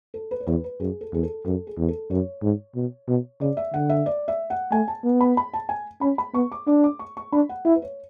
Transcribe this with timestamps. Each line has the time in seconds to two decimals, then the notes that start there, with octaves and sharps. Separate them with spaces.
0.14 A4
0.31 B4
0.40 C#5
0.47 E2 B4
0.64 B4
0.80 F#2 G#4
1.01 A4
1.13 E2 G#4
1.23 A4
1.45 F#2 A4
1.67 G#4
1.78 E2
1.88 A4
2.10 F#2 C#5
2.43 G#2
2.75 B2
3.08 B2
3.40 C#3 D5
3.57 E5
3.74 D3 F#5
3.89 E5
4.06 D5
4.28 E5
4.50 F#5
4.72 A3 G#5
4.88 A5
5.04 B3
5.21 B5
5.37 B5
5.54 A5
5.69 G#5
6.01 C#4 B5
6.18 B5
6.34 B3 C#6
6.52 D6
6.67 D4 D6
6.84 D6
6.99 C#6
7.17 C#6
7.32 D4 B5
7.49 F#5
7.65 E4 E5
7.75 B4
7.82 C#5